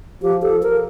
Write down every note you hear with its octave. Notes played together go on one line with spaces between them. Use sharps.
F3 G4
A4
A#4